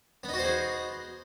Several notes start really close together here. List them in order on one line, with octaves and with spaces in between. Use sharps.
B3 D#4 F#4 C5 G#4